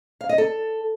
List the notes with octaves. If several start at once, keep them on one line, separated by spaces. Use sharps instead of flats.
F5
D#5
A4